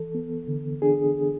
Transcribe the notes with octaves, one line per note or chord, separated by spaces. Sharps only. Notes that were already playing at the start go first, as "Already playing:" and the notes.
Already playing: E3 A4
B3
D3
D4 G#4